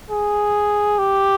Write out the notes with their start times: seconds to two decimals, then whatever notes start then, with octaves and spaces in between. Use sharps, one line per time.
0.11 G#4
0.99 G4